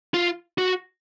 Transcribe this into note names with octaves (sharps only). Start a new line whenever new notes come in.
F4
F#4